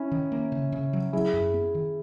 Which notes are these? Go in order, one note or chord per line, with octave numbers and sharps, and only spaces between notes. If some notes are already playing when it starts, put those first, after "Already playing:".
Already playing: C#4 E4
D#3
A#3
C#3
C#3
F#3
F#3 E4 G#4
F#2
B3
D#3